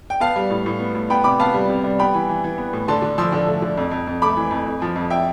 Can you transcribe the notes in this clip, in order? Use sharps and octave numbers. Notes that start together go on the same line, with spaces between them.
G5
B3 F5 A5
G3
A2
A2
B3
A2
B3 G5 B5
C3 B5 D6
B3 F5 A5
G3
C3
G3
B3 G5 B5
E3
E3
E3
B3
A2
D3 A5 C6
D3
F3 C6 E6
D3
A3
D3
F2
F2
F2
A3 B5 D6
E3
F2
F2
F3
F2
E5 G5